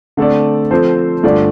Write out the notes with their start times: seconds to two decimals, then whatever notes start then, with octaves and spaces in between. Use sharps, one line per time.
0.17 D3 A3 C4 A4 D5
0.71 F3 C4 A4 C5
1.23 G2 D3 A3 F4 D5